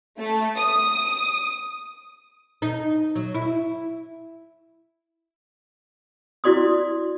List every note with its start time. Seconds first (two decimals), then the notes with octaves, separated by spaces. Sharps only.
0.19 A3
0.57 D#6
2.62 D#4
3.16 F#3
3.35 E4
6.44 E4 F#4 D5 C6 D#6